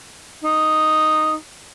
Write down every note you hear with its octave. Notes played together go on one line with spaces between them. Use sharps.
D#4